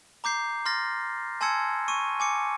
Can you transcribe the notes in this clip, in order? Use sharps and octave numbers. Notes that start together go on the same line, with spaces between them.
A#5 D6 G6 C7
C6 F6 A6 A#6
G#5 A5 C6 E6 G#6 C#7
C#6 D#7
G#5 D6 C#7